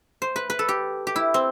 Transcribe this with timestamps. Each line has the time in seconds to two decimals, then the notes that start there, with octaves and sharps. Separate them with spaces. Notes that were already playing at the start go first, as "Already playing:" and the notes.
0.22 C5
0.36 B4
0.50 B4
0.59 A4
0.69 G4
1.07 G4
1.16 E4
1.34 C4